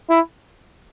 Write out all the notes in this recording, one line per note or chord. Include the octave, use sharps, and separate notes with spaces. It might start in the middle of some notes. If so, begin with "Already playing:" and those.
E4